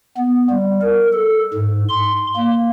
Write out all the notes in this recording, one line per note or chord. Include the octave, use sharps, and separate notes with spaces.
B3
G3
A#4
A4
G#2
C6
A#3